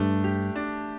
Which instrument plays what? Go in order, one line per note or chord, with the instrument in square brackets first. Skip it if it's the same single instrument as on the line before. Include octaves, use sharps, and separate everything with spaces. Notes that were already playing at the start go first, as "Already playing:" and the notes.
Already playing: [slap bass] G2 [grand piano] A3 D4
[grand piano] G4
D4